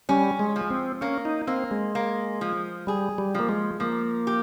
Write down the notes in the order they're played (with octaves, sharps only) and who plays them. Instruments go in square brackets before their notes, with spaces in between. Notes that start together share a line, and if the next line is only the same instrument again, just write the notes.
[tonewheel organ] G3 [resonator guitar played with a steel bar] C#4
[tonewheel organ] G#3
[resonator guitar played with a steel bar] F3
[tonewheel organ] C4
[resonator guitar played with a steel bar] A#3 [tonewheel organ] C#4
[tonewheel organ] D#4
[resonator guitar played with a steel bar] A#3 [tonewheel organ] C4
[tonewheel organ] G#3
[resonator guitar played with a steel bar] A#3
F3
[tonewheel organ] G3 [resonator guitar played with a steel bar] G#4
[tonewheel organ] G3
[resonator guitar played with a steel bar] F3 [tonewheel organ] A#3
[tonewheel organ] G#3
[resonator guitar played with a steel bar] F3 [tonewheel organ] A#3
[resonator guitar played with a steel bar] G4